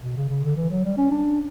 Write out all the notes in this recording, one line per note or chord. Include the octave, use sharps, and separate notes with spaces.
B2
C#3
C#3
D3
E3
F#3
G3
C#4
D4